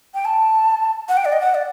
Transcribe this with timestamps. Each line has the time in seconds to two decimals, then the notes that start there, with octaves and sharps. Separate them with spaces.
0.14 G5
0.25 A5
1.09 F#5
1.17 G5
1.25 D5
1.32 D#5
1.40 F#5
1.54 D5